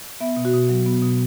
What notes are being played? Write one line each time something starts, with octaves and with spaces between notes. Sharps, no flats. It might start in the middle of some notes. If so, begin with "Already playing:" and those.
B3 E5
B2
F#4
B2
F#3
B3
B2